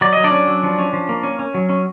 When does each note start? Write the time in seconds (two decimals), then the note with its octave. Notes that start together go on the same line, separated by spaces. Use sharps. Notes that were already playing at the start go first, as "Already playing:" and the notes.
0.01 F#3 D5
0.13 F#3 D#5
0.24 D4 D5
0.32 C#4
0.48 F#3
0.63 F3
0.79 C#4
0.93 F3
1.09 A#3
1.23 C#4
1.39 C#4
1.54 F#3
1.69 C#4